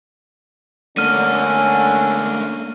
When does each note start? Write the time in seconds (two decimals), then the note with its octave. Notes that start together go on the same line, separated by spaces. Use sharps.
0.97 D3 A3 A#3 C#4 F6 D#7